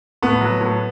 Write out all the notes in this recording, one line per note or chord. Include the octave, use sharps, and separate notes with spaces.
A2 B3
F#3
A2